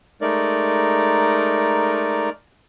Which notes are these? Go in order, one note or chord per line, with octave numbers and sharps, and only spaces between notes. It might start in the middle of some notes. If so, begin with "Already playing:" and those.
G#3 A3 D#4 A#4 D5